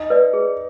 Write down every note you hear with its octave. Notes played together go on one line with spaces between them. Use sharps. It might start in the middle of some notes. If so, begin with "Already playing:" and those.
Already playing: D#4
B4 D5
G#4